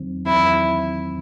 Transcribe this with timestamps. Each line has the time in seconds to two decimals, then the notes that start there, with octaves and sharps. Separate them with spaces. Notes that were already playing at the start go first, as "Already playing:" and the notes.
Already playing: E2 D#3 F#3 C4
0.26 E2 D#3 F#3 C4 E4